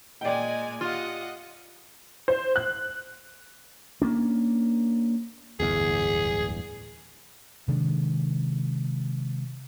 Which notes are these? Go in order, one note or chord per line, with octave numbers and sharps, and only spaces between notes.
A#2 G#3 D5 D#5 G5 G#5
F4 G4 D#5 F#5
C5
F#6
A#3 C#4 D4
D1 G1 E2 G#4
C3 D#3 G#3 D4